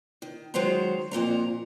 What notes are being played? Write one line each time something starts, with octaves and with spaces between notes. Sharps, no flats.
D#3
D#3 F#3 G#3 C5 F#5 A#5
F2 A#2 A#4 A#5